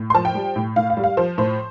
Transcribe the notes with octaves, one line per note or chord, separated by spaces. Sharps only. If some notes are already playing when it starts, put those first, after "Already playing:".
Already playing: A2
C6
F3 A5
G5
G3
A2
A2 F5
F5
G3
F5
F3 C5
A2 C5